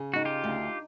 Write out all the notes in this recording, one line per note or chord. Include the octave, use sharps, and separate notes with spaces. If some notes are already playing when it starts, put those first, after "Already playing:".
Already playing: C#3
D#4 F#4
F4 G4
D2